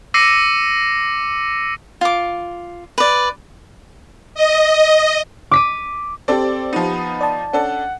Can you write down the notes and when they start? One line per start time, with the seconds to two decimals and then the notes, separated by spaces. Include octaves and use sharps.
0.14 D6 E6 A#6 C7 C#7 D#7
2.01 F4 D6
2.98 B4 D5
4.35 D#5
5.51 D6 B6 D#7
6.28 C4 G4 A4 C5 D5
6.73 F3 B3 D#4
7.21 D5 A5
7.53 C#4 D4 A4 F#5